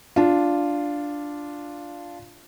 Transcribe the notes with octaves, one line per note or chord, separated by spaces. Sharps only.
D4 F4